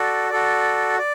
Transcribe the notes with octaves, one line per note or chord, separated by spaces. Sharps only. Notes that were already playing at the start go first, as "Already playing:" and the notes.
Already playing: F#4 A4 D5
F#4 A4 D5
D5